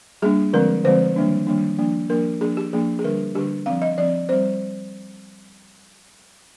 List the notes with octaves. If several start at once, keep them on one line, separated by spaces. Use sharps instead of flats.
G3 A#3 D4 G#4
D3 F3 G#3 C4 A#4
D3 F3 G#3 C4 C5
D#3 G3 A#3 D4
D#3 G3 A#3 D4
F3 A#3 D4
F3 A#3 D4 A#4
F3 A#3 D4 G#4
G4
F3 A#3 D4 G#4
G#4
D3 G3 D4 A#4
D3 G3 D4 G4
F3 C4 F5
D#5
F3 C4 D5
G3 C4 C5